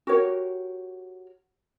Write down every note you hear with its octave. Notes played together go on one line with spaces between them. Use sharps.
F#4 G4 A#4 C#5